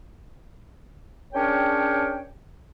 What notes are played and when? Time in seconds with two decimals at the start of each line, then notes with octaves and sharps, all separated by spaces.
1.34 C#4 D4 G#4 A#4 C#5 G5